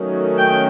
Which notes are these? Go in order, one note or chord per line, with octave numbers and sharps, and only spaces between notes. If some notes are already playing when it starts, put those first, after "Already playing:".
Already playing: D#3 F#3 A3 C#4
G5